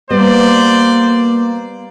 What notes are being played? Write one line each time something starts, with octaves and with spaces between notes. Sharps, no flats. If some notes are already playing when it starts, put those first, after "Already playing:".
G3 A#3 B3 C5 D5